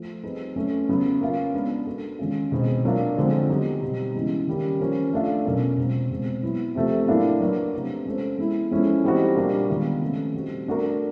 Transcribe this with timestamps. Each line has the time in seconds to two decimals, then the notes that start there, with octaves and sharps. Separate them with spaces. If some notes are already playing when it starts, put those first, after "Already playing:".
Already playing: F3 A3
0.23 G3 C4 D#4 G#4 B4
0.56 F#3 A3 C#4
0.89 C#3 F#3 B3
1.21 A#3 C#4 F4
1.54 G#3 B3 D4
1.86 A#3 D4 F#4 A4
2.19 D#3 G#3 C#4 F4
2.52 B2 G#3 C4 D#4 G#4
2.84 A#2 F#3 A#3 D4 F4
3.17 D3 F3 G#3 C4
3.49 F#3 B3 D#4 G4
3.82 B2 G3 C4 D#4
4.15 C#3 E3 G#3 B3 D#4
4.47 D#3 G3 A#3 C#4
4.80 F3 A#3 C#4
5.13 A3 D4 F4
5.45 B2 F#3 A#3 C#4
5.78 B2 G#3 C4 F4
6.11 B2 G#3 C4
6.43 F#3 B3 E4
6.75 C3 F3 A3
7.08 A2 F#3 A#3 D4 F4
7.41 F#3 A#3 D4 F#4 B4
7.73 C3 F3 A3 D4
8.06 G#3 C#4 F4 A4 C5
8.38 G#3 B3 E4
8.71 F3 G#3 C#4 E4 A4
9.04 E3 G3 C4 D#4 F#4
9.36 A#2 G3 A#3 D4
9.69 D#3 G#3 B3 D4 F4
10.01 C3 F3 A3 C#4
10.34 A#2 G3 C4 D#4 F#4
10.67 A3 D4 F#4 A#4